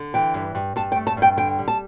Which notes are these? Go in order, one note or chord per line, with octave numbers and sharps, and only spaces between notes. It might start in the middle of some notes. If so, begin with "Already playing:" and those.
Already playing: D3
E3 G5
G2
G2
G2 A5
G5
A3
A5
G2 G5
D3 G5
G3
A5